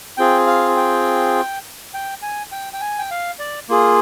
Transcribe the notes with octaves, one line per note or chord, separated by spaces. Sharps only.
C4 F4 G#4 G5
F5
G5
G5
G#5
G5
G5
G#5
G5
F5
D5
A#3 F4 G#4